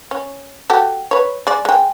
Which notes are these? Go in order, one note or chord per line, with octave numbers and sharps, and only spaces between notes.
C#4
F#4 G4 A4
B4 C#5
G#3 D5
G#3 G5